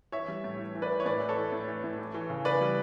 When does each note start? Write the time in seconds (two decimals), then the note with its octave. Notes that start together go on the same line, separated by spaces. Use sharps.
0.12 E3 C#5 E5
0.28 G3
0.44 A2
0.59 E3
0.75 E3
0.82 B4 D5
0.90 E3
1.00 C#5
1.06 A2 B4 D5
1.21 E3
1.29 A4 C#5
1.37 E3
1.52 A2
1.67 E3
1.84 A2
1.99 E3
2.14 E3
2.29 C#3
2.45 C#3 B4 D5
2.61 G3